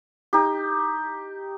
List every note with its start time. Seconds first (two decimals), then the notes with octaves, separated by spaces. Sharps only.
0.33 D#4 G4